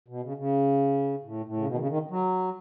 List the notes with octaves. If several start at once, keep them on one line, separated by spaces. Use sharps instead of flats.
B2
C#3
C#3
A2
A2
C#3
B2
D#3
C#3
D#3
F#3